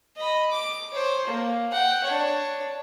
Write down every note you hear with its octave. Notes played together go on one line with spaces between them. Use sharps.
D#5 B5
D6
C5 C#5
A#3
F#5 G5
D4 C#5